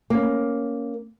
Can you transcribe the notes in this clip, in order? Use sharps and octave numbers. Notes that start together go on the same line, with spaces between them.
A#3 C#4